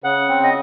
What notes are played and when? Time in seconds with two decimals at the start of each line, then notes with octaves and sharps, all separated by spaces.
0.04 C#3 F#5
0.29 C4
0.43 D#5